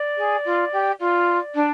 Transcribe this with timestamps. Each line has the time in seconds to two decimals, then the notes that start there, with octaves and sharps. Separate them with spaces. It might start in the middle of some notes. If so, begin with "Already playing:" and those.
Already playing: D5
0.17 G#4
0.45 F4
0.72 G4
1.00 F4 D5
1.55 D4